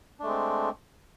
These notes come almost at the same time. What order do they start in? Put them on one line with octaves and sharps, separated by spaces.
D4 A3 G#3 C4